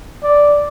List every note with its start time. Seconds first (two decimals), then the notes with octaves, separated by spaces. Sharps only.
0.23 D5